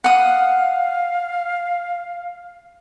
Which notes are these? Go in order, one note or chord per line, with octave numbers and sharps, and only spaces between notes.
F5 F#5 D#6